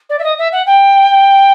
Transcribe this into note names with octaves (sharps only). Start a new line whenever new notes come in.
D5
E5
D#5
E5
F#5
G5